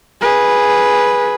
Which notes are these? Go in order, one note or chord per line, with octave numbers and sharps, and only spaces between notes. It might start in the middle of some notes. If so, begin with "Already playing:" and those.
G#4 B4